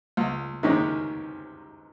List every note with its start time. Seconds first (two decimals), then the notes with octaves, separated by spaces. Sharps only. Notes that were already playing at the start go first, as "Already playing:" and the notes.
0.17 C#2
0.63 C3 D#3 G#3 C#4